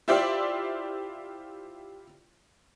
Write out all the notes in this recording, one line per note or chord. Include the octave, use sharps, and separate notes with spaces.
E4 F4 G4 C5 D5 E5